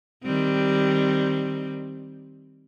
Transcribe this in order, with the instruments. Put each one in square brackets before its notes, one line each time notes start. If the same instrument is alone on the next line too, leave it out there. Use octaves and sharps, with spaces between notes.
[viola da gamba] D#3 G3 C4